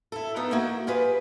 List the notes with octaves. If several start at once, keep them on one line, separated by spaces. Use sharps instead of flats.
E4 A4
F2 B3 D#4 E5 G5
A#3 E4 F#4 F#5 G5
F4 G4 G#4 B4